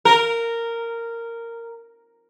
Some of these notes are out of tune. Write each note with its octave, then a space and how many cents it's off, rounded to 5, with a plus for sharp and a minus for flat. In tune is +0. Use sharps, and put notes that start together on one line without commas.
A#4 -10